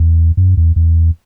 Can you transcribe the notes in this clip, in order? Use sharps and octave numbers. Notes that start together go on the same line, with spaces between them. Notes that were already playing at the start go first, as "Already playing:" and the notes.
Already playing: E2
F#2
E2
E2